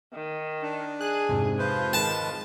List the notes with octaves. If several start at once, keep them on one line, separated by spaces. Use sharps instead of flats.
D#3
D4
G#4 F#6
F2 G#2 C3
F3 B4 C5
D#3 G#3 B4 A5